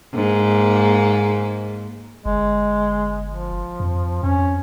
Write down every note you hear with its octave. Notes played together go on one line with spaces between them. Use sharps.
G#2 A#3
G1 G#3
F3
F2
F2 C#4